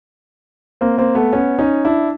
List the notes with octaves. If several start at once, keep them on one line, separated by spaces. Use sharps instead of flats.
A#3 C4
A#3 C4
A3 B3
B3 C#4
C#4 D#4
D4 E4